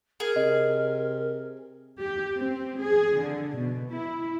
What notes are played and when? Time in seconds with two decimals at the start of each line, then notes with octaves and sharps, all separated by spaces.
0.20 G#4 A#4
0.36 C3 D#5
2.00 G4
2.35 C4
2.80 G#4
3.19 D3
3.56 B2
3.90 E4